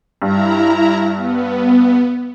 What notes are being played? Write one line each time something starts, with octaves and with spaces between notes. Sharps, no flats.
G2 E4 A#5
B3